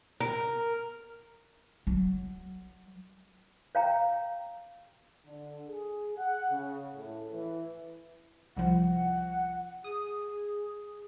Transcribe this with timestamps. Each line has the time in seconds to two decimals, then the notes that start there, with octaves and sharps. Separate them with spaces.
0.20 A#4
1.87 F#3
3.75 C#5 F5 G5 A#5
5.26 D3
5.67 G#4
6.17 F#5
6.51 C#3
6.95 A2
7.31 E3
8.57 C2 F3 F#5
9.84 G#4 D#6